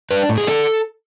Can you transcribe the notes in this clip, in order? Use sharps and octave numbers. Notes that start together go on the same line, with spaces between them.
D4 B4
A2
G#4
D4 A4